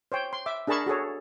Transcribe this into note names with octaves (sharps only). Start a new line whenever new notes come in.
C5 C#5 G5
C6
E5 D6
D4 G#4 A#4 A5 B5 C#6
F#4 G#4 A4 C#5